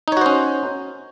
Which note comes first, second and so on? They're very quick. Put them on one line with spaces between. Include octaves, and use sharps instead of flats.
D#4 C#5 F#4 C5 C#4